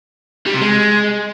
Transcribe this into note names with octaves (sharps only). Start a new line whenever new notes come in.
G3
C3
G#3